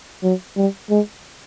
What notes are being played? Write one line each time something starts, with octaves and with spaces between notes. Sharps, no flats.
F#3
G3
G#3